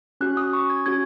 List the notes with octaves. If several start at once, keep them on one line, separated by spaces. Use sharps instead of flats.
C#4 F#4 F#6
D#6
C#6
G#6
C#4 F#4 G#6